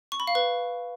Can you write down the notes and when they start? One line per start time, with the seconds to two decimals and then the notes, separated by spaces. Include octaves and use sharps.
0.12 C#6
0.20 B5
0.27 F5
0.35 B4